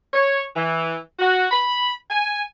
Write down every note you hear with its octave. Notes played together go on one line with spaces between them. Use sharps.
C#5
E3
F#4
B5
G#5